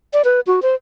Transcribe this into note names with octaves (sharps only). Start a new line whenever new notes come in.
D5
B4
F#4
C5